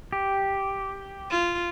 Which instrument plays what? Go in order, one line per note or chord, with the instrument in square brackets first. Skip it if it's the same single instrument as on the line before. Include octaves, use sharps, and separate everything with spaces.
[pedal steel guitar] G4
[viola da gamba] F4